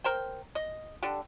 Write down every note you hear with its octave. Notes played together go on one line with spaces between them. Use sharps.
A#4 C5 G5
D#5
D3 D4 G4